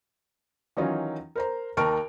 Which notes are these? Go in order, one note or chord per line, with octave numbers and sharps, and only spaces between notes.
D#3 E3 F#3 C#4 D#4 F4
A#4 C5 A#5
D#2 A#4 A5 C#6 F6 D7